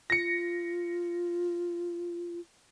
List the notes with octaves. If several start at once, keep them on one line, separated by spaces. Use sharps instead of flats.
F4 A#6 C#7